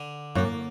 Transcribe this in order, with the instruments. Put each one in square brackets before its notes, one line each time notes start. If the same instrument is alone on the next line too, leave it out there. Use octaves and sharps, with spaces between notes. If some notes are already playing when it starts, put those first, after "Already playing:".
Already playing: [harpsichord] D3 D4
[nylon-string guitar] F#2 [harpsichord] A#3